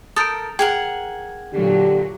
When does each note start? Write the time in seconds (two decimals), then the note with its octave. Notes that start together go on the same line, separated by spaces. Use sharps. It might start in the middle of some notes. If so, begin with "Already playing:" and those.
0.16 A4 A#4 D#6 G6 D7
0.59 G#4 A#4 F#5 G5
1.54 A#2 D3 F#3 G4